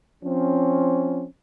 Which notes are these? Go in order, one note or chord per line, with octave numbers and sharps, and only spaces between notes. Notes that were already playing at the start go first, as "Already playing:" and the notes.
F3 C4 C#4